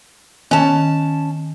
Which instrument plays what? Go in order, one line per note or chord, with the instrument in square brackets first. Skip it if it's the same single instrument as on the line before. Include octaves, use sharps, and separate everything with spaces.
[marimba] D#3 [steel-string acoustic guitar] C#4 A5